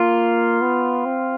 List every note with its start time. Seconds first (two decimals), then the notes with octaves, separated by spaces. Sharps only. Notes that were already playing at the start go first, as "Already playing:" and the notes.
Already playing: A#3 F4
0.62 B3
1.06 C4